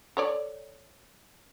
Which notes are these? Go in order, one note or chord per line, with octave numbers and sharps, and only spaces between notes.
A4 C#5 D5